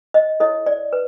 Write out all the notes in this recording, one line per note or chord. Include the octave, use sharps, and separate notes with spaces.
D#5
E4 A4 C#5 D#5
D5
B4